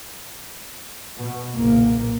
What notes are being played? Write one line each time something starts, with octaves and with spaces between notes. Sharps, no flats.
B2
F#1 B1 A#2 A#3